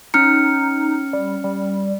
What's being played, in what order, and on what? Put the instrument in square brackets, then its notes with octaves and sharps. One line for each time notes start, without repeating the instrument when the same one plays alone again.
[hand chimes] C#4 F6 C#7 [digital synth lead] D#4
[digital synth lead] G3
G3